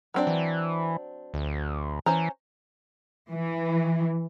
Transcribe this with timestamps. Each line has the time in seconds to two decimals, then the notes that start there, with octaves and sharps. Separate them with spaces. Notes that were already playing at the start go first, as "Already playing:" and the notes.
0.14 F#3 C4 D4
0.27 E3
1.34 D2
2.06 E3 C#4 C5 A#5
3.31 E3